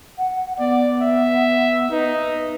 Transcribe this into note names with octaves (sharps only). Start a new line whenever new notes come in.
F#5
B3 D5
E5
D#4 B4